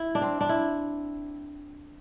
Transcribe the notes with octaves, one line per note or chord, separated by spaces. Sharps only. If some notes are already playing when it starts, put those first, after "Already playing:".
Already playing: E4
D4
C4
D4
E4